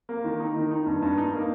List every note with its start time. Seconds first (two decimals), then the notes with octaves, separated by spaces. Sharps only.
0.09 A#3
0.24 D#3
0.40 D#4
0.56 D#3
0.71 D#4
0.86 G2
1.02 G2
1.17 D#4
1.33 A#3